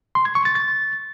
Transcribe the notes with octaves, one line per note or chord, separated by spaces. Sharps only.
C6
G#6
C#6
A6
A6